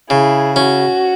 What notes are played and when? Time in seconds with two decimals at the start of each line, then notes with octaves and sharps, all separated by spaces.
0.10 C#3 E4 G#4
0.56 C#4 F#4